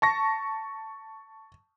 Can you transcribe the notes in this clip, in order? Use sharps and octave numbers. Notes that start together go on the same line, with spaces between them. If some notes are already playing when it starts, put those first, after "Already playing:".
A5 C#6 A#6